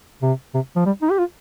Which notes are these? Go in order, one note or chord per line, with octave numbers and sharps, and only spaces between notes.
C3
C3
F3
G3
D#4
G4
F4